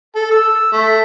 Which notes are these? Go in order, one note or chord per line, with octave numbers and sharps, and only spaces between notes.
A4
E6
A3